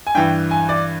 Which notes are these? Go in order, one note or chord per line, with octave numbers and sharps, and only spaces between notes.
G#5
G2 E3 G5
G#5
D5